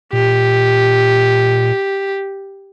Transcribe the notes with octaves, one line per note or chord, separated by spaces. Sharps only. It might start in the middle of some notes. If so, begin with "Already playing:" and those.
A#2 G4